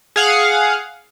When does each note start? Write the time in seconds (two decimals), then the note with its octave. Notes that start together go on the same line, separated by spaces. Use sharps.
0.16 G#4 F5 F#5